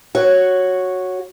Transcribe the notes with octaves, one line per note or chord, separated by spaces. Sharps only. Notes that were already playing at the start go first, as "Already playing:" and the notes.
F#4 C#5